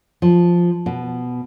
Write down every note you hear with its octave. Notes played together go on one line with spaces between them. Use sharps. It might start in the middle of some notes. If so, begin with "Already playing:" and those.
F3
B2